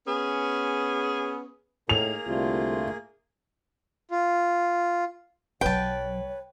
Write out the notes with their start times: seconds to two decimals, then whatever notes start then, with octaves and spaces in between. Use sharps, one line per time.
0.08 B3 C#4 G#4
1.89 A2 A#3 D#4 G#4 A#4 F5 F7
2.26 C2 D3 A3 F4
4.11 F4
5.61 B1 F#3 B4 C#5 G5 A5